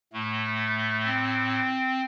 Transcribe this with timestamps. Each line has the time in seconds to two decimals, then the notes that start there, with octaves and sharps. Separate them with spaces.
0.13 A2 A3
1.04 C4